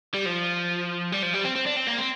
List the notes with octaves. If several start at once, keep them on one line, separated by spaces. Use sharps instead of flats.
G3
F3
G3
F3
G3
C4
C4
D4
C4
A#3
C4